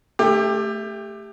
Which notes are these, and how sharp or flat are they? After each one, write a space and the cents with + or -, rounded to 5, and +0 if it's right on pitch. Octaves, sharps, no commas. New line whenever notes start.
A3 +0 G4 +25